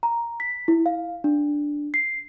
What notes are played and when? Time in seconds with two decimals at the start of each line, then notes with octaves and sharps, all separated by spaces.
0.03 A#5
0.40 B6
0.68 E4
0.86 F5
1.24 D4
1.94 C7